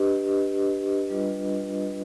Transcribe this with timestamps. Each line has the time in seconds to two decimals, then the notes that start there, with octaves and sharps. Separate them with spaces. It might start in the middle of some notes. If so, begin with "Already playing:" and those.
Already playing: D4 G4 B4 D#5
1.10 G3 D4 F4 B4 D#5